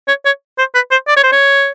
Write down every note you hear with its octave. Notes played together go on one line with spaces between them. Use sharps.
C#5
C#5
C5
B4
C5
D5
C#5
C5
C#5